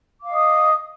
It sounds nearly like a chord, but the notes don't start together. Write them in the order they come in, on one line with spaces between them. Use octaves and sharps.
D6 F5 D#5 D#6